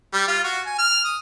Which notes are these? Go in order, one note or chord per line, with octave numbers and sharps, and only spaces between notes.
G3
F4
F#4
G#5
F6
D#6